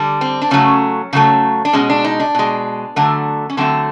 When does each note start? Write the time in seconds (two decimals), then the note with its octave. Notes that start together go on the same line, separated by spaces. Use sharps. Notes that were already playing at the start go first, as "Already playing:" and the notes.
Already playing: D3 G3
0.21 C4
0.42 D4
0.51 C#3 F#3 A3 C#4
1.13 C#3 F#3 A3
1.65 D4
1.73 B2 G#3 C#4
1.90 D4
2.04 D#4
2.20 D4
2.35 B2 G#3
2.96 D3 F#3 A3
3.50 C#4
3.57 D3 F#3 A3 C4